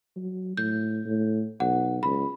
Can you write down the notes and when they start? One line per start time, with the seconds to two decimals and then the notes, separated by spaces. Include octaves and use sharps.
0.16 F#3
0.57 A2 G6
1.06 A2
1.60 B1 F#5
2.03 C#2 B5